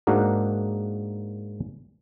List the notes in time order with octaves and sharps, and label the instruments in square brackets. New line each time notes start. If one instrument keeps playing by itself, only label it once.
[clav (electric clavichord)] G#2 A#3 D4 F#4 A#4